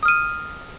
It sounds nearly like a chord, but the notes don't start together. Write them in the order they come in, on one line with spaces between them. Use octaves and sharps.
D#6 F6 D#7